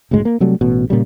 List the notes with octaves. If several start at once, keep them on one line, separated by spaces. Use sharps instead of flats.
F#1 D2 A2 G#3
A#3
C3 F#3 G3 A3
A1 B2
A#2 C#3 G3